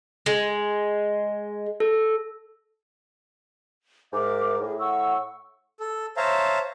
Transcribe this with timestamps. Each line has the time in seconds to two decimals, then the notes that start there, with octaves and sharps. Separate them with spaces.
0.26 G#3
1.80 A4
4.13 G#2 A#4 E5 D6
4.61 A2 G#4
4.79 F#5 C#6 E6
5.80 A4
6.17 C5 C#5 E5 F5 A5 A#5